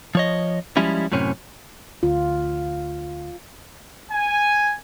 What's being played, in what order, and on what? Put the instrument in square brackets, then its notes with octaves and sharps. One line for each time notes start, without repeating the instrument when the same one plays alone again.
[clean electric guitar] F3 C#5 D#5
F3 G3 G#3 C#4 E4
F#2 A2 C3 C#4
[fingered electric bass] D2 [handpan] F4
[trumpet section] G#5